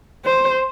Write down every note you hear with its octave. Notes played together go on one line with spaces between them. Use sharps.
C5